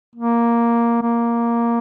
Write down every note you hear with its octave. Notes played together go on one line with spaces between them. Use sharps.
A#3
A#3